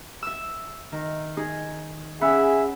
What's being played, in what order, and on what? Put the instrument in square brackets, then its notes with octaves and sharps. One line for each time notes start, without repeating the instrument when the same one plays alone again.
[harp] E5 E6
D#3
D#4 G#4
[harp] C#4 F#5 B5 [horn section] G#4 E5